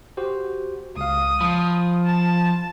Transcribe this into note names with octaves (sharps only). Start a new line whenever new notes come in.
F#4 G4 C5
C#2 F5 D#6
F3 B5
A5